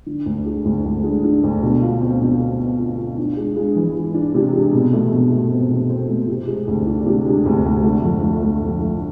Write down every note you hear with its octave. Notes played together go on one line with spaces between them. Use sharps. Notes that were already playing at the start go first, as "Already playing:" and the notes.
D3
D2
G#3
D2
D2
G#3
D3
D2
B2
F4
C4
B2
C4
C4
F4
F4
D4
G#3
G#3
E3
G#3
D4
C3
G#3
B2
A3
B2
A3
C4
B2
C4
A3
C3
G#3
D2
D4
C3
G#3
D2
D2
A3
F2
A3
A3
F2
A3